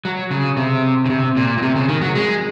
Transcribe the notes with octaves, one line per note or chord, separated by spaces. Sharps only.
F#3
C#3
C3
C#3
C3
A#2
A#2
C3
C#3
D#3
F#3
G#3